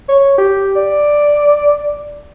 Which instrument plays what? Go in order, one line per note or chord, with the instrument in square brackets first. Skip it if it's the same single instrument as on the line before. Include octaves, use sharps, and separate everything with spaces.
[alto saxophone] C#5
G4
D5